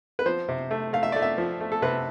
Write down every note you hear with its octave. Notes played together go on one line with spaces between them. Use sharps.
B4
F3 C5
C3
A3
A3 F5
E5
A3 D5
E5
F3
A3
A4
C3 B4